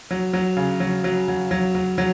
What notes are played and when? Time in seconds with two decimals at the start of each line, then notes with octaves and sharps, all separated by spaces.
0.11 F#3
0.33 F#3
0.57 C#3
0.80 F#3
1.04 F#3
1.28 F#3
1.51 F#3
1.75 F#3
1.98 F#3